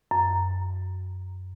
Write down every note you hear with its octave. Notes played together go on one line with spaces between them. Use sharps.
F#2